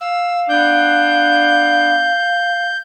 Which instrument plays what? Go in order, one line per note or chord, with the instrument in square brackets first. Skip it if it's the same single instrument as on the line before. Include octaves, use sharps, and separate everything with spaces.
[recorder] F5 [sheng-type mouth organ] E6
[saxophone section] B3 D4 [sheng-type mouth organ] G6